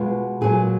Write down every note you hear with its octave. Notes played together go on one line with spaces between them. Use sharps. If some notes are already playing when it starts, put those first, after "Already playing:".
Already playing: B2 G#3 B3 F4
A#2 F#3 A#3 G#4